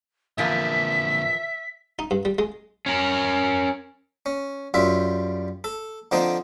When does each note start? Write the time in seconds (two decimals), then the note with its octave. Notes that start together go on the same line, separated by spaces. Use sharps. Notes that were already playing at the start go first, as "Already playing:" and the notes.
0.38 E2 A#2 D3 F3 A#4 E5 B6
1.99 D#4
2.11 G2
2.25 G3
2.39 G#3
2.86 C#4 A#4
4.26 C#4
4.74 F#2 G3 F4 E5
5.64 A4
6.11 D3 F3 C4 D4 D#4